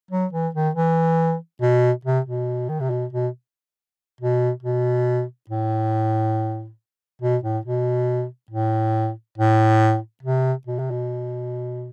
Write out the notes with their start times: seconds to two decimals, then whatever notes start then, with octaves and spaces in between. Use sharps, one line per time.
0.11 F#3
0.33 E3
0.55 D#3
0.75 E3
1.62 B2
2.05 C3
2.26 B2
2.69 D#3
2.80 C3
2.90 B2
3.13 B2
4.21 B2
4.63 B2
5.50 A2
7.22 B2
7.43 A2
7.65 B2
8.51 A2
9.38 A2
10.23 C3
10.67 B2
10.79 C3
10.91 B2